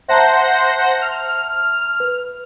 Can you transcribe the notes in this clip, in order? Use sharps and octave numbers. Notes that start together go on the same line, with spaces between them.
C5 E5 F#5 A5 A#5 A#6
F6
B4